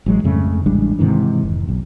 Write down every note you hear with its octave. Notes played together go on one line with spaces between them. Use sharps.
A1 F#3 G#3
F2 G#2 C#3 A3
A1 G3 G#3 D4
G#2 C3 D#3 E3
F1
B1